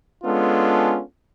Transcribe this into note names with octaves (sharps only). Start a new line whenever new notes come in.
G#3 B3 C#4 D4 F4 A4